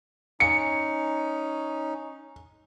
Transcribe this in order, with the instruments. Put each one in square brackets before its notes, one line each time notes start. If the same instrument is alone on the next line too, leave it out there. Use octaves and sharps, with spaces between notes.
[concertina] C#4 D#4 [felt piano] C#7